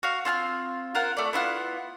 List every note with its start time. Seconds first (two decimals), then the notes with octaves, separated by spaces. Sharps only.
0.03 F#4 F5
0.25 C4 F4 G5 F6
0.95 F4 A#4 C5 F#5
1.17 A3 D5
1.33 B3 E4 F4 F#5